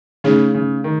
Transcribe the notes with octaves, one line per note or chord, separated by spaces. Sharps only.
C#3 A3 D#4 G#4 C#5
C#3
D#3